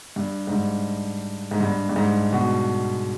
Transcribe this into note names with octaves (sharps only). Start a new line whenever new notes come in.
G2
G#2
G2
G#2
G2
G2
G#2
B2